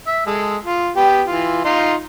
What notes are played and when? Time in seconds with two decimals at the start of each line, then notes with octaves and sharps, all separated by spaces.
0.07 E5
0.26 G#3 A4
0.64 F4
0.96 B3 G4
1.27 E3 F4
1.65 D#4 F4 C6